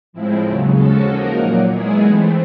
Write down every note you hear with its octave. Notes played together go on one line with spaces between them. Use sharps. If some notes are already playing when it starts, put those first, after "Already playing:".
A2 F3 G#3 C4 E4
D#2 C#3 F#3
F3 G#3 C#4 F#4 A4
F3 A#3 D#4 F#4 A#4
A#2 F#3 A#3
D#3 G#3 B3 E4 G#4
E3 A3 C4